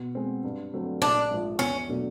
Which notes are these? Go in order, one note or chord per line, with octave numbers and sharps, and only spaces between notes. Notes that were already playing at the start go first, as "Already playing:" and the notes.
Already playing: B2
G#3 C4
G2
D3 F#3 A3 C4
A#1 D4
G#2 F3
E2 C#4
B2 F#3 A3 D4